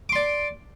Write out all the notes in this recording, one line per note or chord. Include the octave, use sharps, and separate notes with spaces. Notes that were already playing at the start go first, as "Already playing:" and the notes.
D5 C6 D6